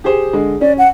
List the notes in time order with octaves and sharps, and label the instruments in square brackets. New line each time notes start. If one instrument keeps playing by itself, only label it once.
[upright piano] G4 G#4 C5
D3 G#3
[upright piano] C#4 [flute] D5
[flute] F#5